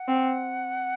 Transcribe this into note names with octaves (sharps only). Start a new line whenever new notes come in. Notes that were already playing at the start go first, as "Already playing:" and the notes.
Already playing: F#5
C4